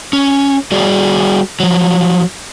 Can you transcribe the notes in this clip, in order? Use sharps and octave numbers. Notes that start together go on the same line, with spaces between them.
C#4
G3 F#4 G#4 D5
F3 F#3